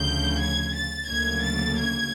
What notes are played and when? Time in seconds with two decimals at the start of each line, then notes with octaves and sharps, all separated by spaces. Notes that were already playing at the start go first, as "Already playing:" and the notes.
Already playing: D2 C#3 F3 G6
0.40 G#6
0.74 A6
1.09 D2 C#3 F#3 A#3 G#6
1.43 A6
1.77 G#6